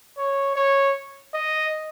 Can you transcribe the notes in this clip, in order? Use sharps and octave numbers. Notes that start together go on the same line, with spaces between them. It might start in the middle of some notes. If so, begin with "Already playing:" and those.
C#5
C#5
D#5